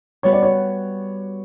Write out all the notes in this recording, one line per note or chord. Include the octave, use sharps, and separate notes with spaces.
G3 B3 F#4 B4 C#5
D5
C#5